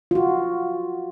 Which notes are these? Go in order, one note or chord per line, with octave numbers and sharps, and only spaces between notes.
F4 F#4